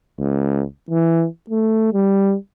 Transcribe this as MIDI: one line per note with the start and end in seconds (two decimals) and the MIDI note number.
0.19 0.64 37
0.90 1.26 52
1.50 1.92 57
1.94 2.35 55